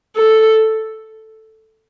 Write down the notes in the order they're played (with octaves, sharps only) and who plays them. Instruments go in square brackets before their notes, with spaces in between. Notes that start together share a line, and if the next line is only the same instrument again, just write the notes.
[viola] A4